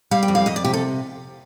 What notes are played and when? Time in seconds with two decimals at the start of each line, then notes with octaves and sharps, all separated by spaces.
0.11 G3 F5
0.23 G5
0.28 F2
0.35 F5
0.46 F2 D#5
0.56 D5
0.64 C3 G4
0.74 A4